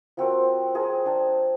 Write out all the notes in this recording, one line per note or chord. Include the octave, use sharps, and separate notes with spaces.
F3 C4 F#4 A#4
C4 G#4 A#4 A#5
D4 G5 A5